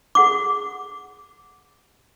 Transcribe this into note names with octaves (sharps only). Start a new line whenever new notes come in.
G#4 F#5 D6